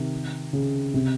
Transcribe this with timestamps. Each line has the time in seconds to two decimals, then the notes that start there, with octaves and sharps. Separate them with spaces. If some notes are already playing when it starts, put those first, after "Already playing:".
Already playing: C3 D#3
0.53 C#3
0.94 C3